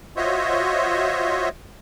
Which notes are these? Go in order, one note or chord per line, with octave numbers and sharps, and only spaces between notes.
F4 F#4 C5 C#5 D#5 E5